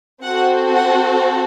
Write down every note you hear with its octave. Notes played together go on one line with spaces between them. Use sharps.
C4 F#4 A4 F#5
F#5